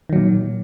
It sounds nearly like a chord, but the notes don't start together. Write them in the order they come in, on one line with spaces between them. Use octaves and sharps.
D#3 F#3 A#2